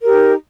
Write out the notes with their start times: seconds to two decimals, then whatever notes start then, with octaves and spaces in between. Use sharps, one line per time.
0.01 A#4
0.06 G4
0.10 D#4